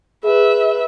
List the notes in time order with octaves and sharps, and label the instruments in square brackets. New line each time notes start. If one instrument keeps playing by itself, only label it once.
[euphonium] G#4 [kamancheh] B4 E5